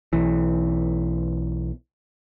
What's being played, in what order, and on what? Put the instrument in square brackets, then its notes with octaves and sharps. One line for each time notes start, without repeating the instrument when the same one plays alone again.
[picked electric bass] B1 E3